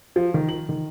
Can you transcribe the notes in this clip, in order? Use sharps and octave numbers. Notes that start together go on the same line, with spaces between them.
F3
D#3
F#7
D#3